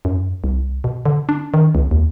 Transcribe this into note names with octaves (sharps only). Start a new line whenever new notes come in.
F#2
C2
B2
D3
D4
D#3
C#2
D#2